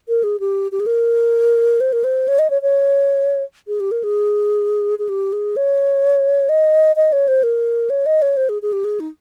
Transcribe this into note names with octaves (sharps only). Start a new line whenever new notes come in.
A#4
G#4
G4
G4
G#4
A#4
C5
A#4
C5
C#5
D#5
C#5
C#5
G#4
G4
A#4
G#4
G#4
G4
G#4
C#5
D#5
D#5
C#5
C5
A#4
C#5
D#5
C#5
C5
G#4
G#4
G4
G#4
D#4